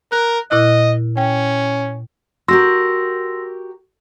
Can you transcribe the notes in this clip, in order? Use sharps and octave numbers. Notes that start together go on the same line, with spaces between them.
A#4 F#6
A#2 E4 D#5 F#6
C#4 G5
F#4 G4 A#4 C6 E6 A#6